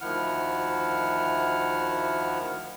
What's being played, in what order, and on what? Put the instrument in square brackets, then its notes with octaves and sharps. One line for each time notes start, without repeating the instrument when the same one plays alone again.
[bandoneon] D2 D#3 F3 E4 F#5 F6